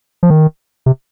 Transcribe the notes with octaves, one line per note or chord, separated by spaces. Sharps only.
F3
D#3
C3